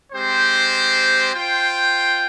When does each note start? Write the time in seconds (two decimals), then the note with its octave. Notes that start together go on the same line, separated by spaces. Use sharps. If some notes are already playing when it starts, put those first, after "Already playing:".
0.13 G#3 C4 G4 C5
1.33 F4 C5 G5